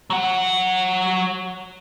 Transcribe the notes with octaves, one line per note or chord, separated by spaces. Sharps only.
F#3 F#5